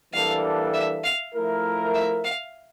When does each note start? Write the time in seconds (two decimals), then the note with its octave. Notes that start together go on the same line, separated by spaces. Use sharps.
0.13 E3 G3 A#3 D4 A4 F5
0.73 E5
1.04 F5
1.33 F3 A3 E4 A#4
1.94 E5
2.24 F5